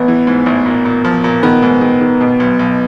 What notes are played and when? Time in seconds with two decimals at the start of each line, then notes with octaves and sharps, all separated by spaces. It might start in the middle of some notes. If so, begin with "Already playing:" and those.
Already playing: A1 B3 B4
0.08 E3
0.27 G#2
0.46 A1
0.66 A#2
0.85 A#2
1.05 F3
1.24 A#2
1.43 D#3 B3 B4
1.62 G#2
1.81 D#3
2.01 D#3
2.21 B2
2.40 B1
2.59 B1